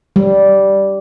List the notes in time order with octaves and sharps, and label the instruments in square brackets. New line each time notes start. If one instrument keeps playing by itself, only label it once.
[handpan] G3